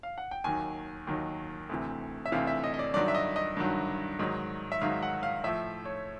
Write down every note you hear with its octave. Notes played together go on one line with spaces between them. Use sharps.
F5
F#5
G5
D#2 D#3 F#3 G#5
D#2 D#3 F#3
D2 C3 E3
E5
D2 C3 E3 F5
E5
D#5
D#5
D5
G2 D#3 F#3 D5
E5
D#5
D#5
G2 D#3 F#3
G#2 D#3 F#3
E5
G#2 D#3 F#3 F5
F#5
F5
A2 F3 E5
C#5